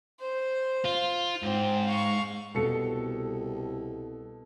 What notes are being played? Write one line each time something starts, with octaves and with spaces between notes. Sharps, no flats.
C5
F4
G#2 C4
F5 C#6
C2 B2 A4 C#7